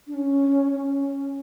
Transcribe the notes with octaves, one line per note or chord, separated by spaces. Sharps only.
D4
C#4
C#4